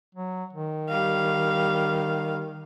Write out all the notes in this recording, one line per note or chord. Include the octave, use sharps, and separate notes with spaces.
F#3
D#3
G3 F5